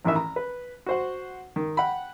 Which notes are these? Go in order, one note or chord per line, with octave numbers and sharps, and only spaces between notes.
A1 D#3 E3 E5
A#5
B4
F#4 C5 F#5
D#3
F#5 G5 B5